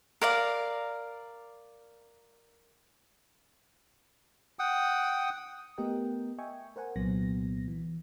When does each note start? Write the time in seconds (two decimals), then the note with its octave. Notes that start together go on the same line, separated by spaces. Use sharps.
0.22 A#4 D5 F5
4.59 F#5 G5 D#6
5.78 A3 B3 G4 A#4 D#5 G5
6.38 D#5 E5 G5 G#5 C#6
6.76 A#4 C5 F#5 G#5
6.96 C2 A#2 F#3 B3 A#6
7.68 E3